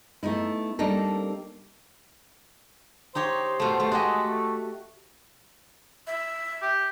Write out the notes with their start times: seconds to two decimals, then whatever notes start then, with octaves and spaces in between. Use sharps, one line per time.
0.23 A3 B3 D#4 E4
0.79 G3 A#3 C4 D4 D#4 A4
3.15 D#4 G4 C5 C#5
3.60 B2 A3
3.80 A3
3.92 G#3 F#4 G4 D#5
4.28 A3
6.07 E5
6.62 G4